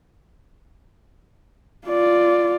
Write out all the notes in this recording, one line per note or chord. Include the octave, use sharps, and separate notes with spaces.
F4 D5